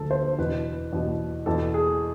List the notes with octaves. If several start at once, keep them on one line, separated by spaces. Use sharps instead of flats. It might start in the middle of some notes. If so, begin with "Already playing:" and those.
Already playing: D2 D3 F3 A4
C5
E2 B2 B4
E2 B2
E2 B2 A4
G#4